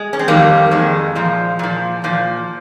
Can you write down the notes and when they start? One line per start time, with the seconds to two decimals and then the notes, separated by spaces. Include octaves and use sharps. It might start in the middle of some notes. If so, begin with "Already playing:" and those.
Already playing: G#3
0.13 C#4
0.19 C4
0.28 F2 D#3 G3 A#3
0.71 F2 D#3 G#3
1.15 A#2 F3
1.59 A#2 F3
2.04 A#2 F3